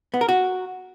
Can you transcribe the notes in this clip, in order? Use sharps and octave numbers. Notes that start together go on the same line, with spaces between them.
B3
A#4
F#4